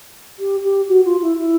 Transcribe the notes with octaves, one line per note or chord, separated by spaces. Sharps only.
G4
G4
F#4
F4
E4
E4